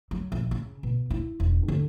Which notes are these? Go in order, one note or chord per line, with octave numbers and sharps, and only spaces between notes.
F#3
A#1
C#3
B2
E4
E1
D3